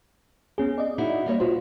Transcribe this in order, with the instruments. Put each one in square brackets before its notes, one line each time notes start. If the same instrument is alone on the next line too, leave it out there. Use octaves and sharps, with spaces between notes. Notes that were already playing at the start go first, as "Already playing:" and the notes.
[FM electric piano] B3 C#4 G#4
D5 D#5
[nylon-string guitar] D#4 E4 F#4
G3 A#3 C#5
[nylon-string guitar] B2 [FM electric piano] F4 F#4 C5